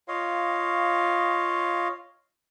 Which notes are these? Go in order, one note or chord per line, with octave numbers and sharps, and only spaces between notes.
F4 C#5 D#5 F5